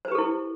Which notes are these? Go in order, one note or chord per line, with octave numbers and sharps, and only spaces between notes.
E4 G4 A4 B4 C5